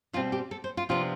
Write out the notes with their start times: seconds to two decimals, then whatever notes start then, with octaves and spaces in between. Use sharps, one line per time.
0.13 B2 G3 C4 F4
0.32 G4
0.51 A4
0.64 C5
0.77 F4
0.89 C3 F3 B3 D4 F4